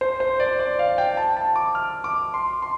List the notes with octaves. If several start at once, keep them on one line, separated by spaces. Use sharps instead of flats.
C5
C5
D5
D5
F5
G5
A5
A5
D6
F6
D6
C6
C6